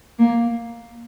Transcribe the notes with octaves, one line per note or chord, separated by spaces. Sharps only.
A#3